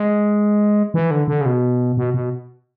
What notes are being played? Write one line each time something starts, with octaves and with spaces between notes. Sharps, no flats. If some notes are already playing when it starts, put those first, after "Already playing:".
Already playing: G#3
E3
D3
D3
C#3
B2
B2
B2